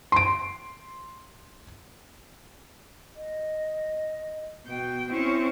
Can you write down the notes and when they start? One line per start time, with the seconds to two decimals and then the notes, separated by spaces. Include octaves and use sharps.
0.12 C6 D7
3.16 D#5
4.66 B2 G5
5.11 C4 C#4 E4